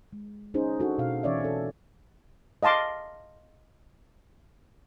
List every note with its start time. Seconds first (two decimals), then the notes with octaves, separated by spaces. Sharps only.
0.13 G#3
0.54 C#4 D#4 G#4 C5
0.80 D4 D#4 F#4 A4
0.98 B2 F5
1.23 E3 C#4 C#5 D5 E5
1.40 C4 A4
2.63 D#5 F5 A5 C6 D6